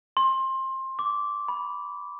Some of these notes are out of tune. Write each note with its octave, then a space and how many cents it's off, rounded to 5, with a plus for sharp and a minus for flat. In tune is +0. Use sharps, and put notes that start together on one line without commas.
C6 +20
D6 -15
B5 -5